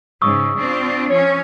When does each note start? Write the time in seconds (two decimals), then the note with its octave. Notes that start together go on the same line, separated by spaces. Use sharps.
0.22 G#2 C#3 C#6 D#6 E6
0.58 C4 D4 F4
1.10 F3 C#4 C#5